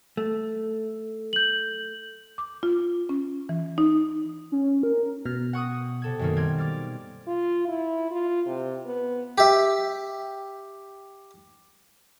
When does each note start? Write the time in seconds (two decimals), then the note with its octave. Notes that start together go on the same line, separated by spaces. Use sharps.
0.17 A3
1.33 G6 F#7
2.38 D6
2.63 F4
3.09 C#4
3.49 E3
3.78 D#4
4.52 C#4
4.83 A#4
5.25 B2 F6
5.53 F#5 C#6 D#6
6.02 C3 A4 G#6
6.19 F#2 D#3 A#3
6.37 G3 C4 G#6
6.58 D6 F6 A6
7.27 F4
7.68 E4
8.11 F4
8.46 C3
8.86 B3
9.38 G4 E5